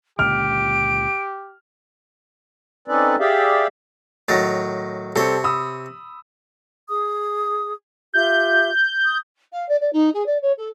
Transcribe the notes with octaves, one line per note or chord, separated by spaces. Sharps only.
C#2 A#2 D3 G4 F6 D7
C4 C#4 D#4 A4 B4 D5
G4 G#4 D5 E5 F5 G5
A2 D#3 F#3 A6 A#6
C3 G3 C4 A4 C#5
B5 D#6 E6
G#4 D#6
F4 G4 E5 G6
D#6
F5
D5
D5
D#4
G#4
D5
C#5
A4